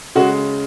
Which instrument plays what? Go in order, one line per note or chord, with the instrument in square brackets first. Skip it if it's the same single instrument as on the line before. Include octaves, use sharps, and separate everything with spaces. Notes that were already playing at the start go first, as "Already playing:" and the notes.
[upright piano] C#3 G#3 F#4